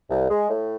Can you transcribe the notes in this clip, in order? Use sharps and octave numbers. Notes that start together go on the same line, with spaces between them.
C2
G#3
A2